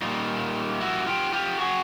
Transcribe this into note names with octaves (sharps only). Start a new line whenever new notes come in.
A#2 G3 A#3 D#4 F4
E4 F#4
F4 G4
F4 G4
F#4 G#4